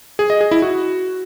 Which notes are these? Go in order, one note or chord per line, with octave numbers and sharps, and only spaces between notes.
G#4
D#5
G#4
E4
F#4